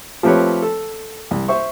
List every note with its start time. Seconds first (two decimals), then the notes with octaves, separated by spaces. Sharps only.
0.23 F3 A3 C4 G4 B4 C#5
0.62 A4
1.31 C2
1.48 C5 E5 C#6